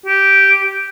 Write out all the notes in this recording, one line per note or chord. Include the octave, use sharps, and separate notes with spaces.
G4